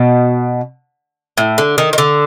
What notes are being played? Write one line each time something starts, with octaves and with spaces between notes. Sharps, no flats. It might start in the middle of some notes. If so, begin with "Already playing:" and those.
Already playing: B2
A2
D3
D#3
D#3
D3